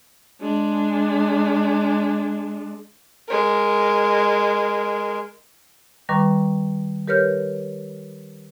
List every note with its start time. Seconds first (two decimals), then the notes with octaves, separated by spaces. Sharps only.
0.41 G#3 D4
3.29 G#3 A#4
6.09 D#3 G3 B4 A#5 C#6 D6
7.08 G4 A#4 B4 C#5 F6 G6